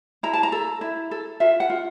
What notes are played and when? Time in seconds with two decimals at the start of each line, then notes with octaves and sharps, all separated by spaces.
0.23 E4 A#5
0.33 A5
0.43 A#5
0.52 A4
0.81 E4
1.11 A4
1.40 F4 E5
1.60 F#5
1.70 F4